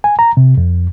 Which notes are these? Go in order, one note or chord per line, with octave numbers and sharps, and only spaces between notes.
G#5
A#5
C3
F2